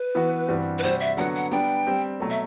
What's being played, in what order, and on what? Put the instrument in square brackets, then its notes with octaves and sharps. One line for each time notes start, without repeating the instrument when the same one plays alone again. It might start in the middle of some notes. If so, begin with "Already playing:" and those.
Already playing: [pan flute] B4
[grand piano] E3 B3 F#4
G2 E3 G3 C4 F#4
[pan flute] B4
[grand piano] C3 G3 C4 F#4 [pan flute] C5
[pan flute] E5
[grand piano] D3 F#3 B3 F#4 [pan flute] F#5
[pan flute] F#5
[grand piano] G3 B3 D4 [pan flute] G5
[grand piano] G3 C4 G4
B2 F#3 A3
[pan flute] E5